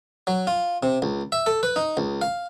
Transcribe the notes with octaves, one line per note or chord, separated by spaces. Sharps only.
F#3
F4
C3
C#2
E5
A4
B4
D#4
C#2
F5